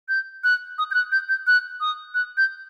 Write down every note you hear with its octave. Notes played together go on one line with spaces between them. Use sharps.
G6
F#6
D#6
G6
F#6
G6
G6
F#6
D#6
F#6
G6